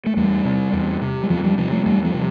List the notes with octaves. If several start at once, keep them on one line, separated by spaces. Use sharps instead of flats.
A3
E2 G3
C3
E2
C3
G3
E2 F3
G3
C3 F3
A3
E2 G3
F3
C3